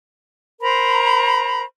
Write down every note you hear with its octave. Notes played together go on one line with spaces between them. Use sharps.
A#4 C5 A#5 B5